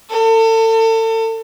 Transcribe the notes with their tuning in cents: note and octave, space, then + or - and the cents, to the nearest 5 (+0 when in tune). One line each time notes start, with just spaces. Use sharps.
A4 +35